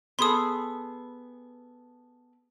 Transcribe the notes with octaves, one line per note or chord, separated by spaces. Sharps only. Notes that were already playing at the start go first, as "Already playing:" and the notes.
B3 G#4 A4 C6 D#6